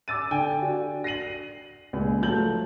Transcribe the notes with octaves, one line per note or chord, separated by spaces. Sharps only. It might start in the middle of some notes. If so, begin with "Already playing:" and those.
D6 E6 A6 D#7
D3 G5 G#5
D4 F#4
A#6 C7 D#7 F#7
C#2 A#2
F3 F#3 A3 G6 F#7